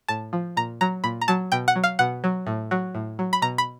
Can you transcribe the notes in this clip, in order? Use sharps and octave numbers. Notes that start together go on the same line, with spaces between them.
A2 A5
F3
A#2 A#5
F#3 A#5
A#2 B5
A#5
F#3 A5
B2 G5
F#5
F#3
F5
B2 F#5
F#3
A2
F#3
A2
F#3
B5
B2 A#5
B5